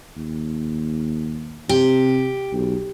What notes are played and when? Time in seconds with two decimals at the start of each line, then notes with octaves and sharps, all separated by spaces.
0.16 D#2
1.69 C3 G4
2.53 B1